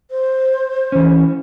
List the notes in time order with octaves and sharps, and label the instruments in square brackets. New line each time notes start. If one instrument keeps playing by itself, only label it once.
[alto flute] C5
[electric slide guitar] E3 C#4